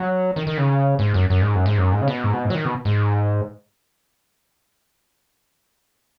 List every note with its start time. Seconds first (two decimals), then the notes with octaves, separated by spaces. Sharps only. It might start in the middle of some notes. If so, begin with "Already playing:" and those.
Already playing: F#3
0.36 D#3
0.47 D#3
0.57 C#3
0.99 G#2
1.14 F#2
1.30 F#2
1.42 G#2
1.55 F#2
1.66 G#2
1.78 F#2
1.92 G#2
2.01 C#3
2.08 B2
2.24 G#2
2.33 B2
2.45 G#2
2.50 F#3
2.55 D#3
2.65 B2
2.85 G#2